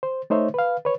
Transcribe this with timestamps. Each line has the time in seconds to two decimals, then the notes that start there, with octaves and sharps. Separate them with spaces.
0.03 C5
0.30 A3 D#4 C5 C#5 E5
0.54 B4 F5
0.85 B4 C#5